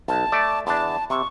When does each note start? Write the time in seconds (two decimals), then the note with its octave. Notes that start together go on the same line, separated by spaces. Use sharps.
0.08 B1 A5
0.32 A3 D5
0.67 E2 D4 A5
1.10 C3 C#6